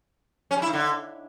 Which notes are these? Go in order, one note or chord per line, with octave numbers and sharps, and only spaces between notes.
C#4
G3
E4
D#3
D3